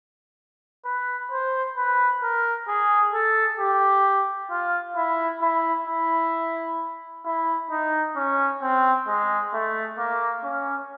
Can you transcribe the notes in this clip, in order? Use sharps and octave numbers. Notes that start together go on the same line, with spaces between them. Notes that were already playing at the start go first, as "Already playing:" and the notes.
B4
C5
B4
A#4
G#4
A4
G4
F4
E4
E4
E4
E4
D#4
C#4
C4
G#3
A3
A#3
C#4